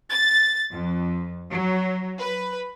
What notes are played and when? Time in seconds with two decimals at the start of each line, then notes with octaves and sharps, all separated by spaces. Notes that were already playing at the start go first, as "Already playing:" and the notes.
0.10 A6
0.71 F2
1.51 F#3
2.19 B4